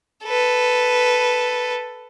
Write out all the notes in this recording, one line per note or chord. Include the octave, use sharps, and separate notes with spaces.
A4 B4